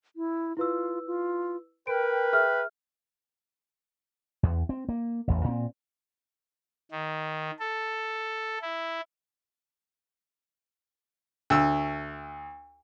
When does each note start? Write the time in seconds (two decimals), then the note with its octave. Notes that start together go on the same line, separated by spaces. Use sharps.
0.16 E4
0.57 E4 F4 B4 E6
1.07 F4
1.87 A#4 B4 G5 D7
2.33 G#4 E5 F6
4.43 E2
4.69 C4
4.89 A#3
5.28 A1 E2
5.44 A#2 C4
6.92 D#3
7.59 A4
8.62 E4
11.50 D2 E6